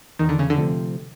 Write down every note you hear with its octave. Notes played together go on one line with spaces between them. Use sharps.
E2 D#3
D3
C#3
D3
C3 F3 A3 C4